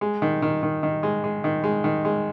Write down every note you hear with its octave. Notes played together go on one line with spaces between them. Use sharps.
G#3
D#3
D#3
D#3
D#3
G#3
G#3
D#3
G#3
D#3
G#3